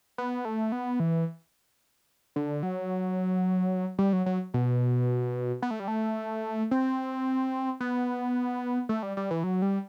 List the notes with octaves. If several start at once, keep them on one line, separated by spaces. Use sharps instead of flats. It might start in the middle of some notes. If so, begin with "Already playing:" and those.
B3
A3
B3
E3
D3
F#3
G3
F#3
F#3
B2
B3
A3
G3
A3
C4
B3
A3
G3
G3
E3
F#3
G3